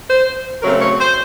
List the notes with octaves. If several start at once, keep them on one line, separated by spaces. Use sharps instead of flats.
C5
C#3 F#3 A3 C4 A#4
C#5
C5